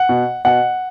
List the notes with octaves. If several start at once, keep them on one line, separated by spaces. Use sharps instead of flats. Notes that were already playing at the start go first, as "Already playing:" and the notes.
Already playing: F#5
B2
B2 F#5